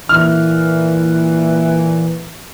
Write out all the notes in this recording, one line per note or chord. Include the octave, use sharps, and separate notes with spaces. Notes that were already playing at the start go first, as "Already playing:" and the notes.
A#2 E3 F6